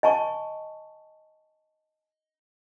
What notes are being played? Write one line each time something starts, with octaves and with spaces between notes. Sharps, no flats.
D#5 G#5 A5 C#6